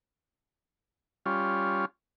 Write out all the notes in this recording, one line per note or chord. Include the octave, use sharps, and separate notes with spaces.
G3 C#4 F4